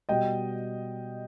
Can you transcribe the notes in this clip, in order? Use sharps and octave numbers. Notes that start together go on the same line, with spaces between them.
B2 G3 D#5 G5